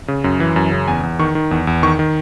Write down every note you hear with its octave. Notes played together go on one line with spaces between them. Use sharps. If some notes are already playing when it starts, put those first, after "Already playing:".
C#3
F#2
E3
F#2
C#3
E2 G#5
E2
D#3 C#6
D#3
E2
E2
D#3 C#6
D#3